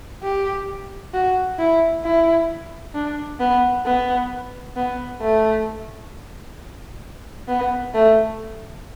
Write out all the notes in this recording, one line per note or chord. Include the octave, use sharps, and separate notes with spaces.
G4
F#4
E4
E4
D4
B3
B3
B3
A3
B3
A3